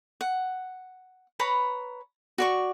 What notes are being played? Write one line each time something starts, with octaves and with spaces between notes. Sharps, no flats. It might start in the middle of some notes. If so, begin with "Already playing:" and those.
F#5
B4 C#5 A#5 B5
F#4 D5 C#6